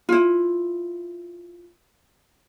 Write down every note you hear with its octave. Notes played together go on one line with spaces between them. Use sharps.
E4 F4